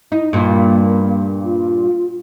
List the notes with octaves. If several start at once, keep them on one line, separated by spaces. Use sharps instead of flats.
D#4 E4
G2 A#2 A#3
F4